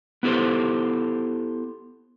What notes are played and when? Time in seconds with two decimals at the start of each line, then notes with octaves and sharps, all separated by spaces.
0.23 B3 E4 G4 A4 C5